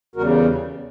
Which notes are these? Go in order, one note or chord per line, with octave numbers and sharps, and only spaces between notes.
E2 C#3 G3 F#4 A#4